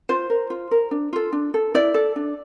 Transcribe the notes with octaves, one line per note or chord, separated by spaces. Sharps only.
F4 C5
A#4
F4
A#4
D4
F4 A4
D4
A4
E4 D5
A4
D4